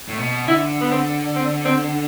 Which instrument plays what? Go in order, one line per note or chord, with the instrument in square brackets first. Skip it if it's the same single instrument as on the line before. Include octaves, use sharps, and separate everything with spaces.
[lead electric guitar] A2
B2
[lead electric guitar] D3 [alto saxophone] E4
[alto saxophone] B3
C4
C4
C4